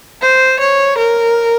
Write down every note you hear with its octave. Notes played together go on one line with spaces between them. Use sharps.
C5
C#5
A#4